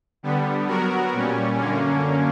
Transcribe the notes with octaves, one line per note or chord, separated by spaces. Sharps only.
D3 G3 B3
F#3 B3 F#4 A#4
A#2 G3 C#4
F#2 D3 A#3 C#4